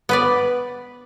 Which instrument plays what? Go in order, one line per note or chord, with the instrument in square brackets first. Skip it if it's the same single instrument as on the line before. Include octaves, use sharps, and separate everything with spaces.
[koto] B3 B4 D5